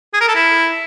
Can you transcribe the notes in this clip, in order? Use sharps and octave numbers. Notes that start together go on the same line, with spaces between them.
G#4
A#4
A4
E4